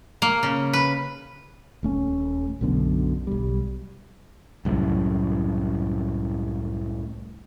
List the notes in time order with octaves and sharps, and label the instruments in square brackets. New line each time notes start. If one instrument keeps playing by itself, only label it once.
[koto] A#3
C#3
B4
[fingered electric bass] D#1 A3 C#4
B1 F#2 B2 D3
B1 G3
C2 F#2 A2